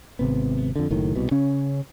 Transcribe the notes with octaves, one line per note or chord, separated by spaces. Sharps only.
G#1 C3 B3
F2 D3
F#1 A2 D#3
C2 B2
C#3 C#4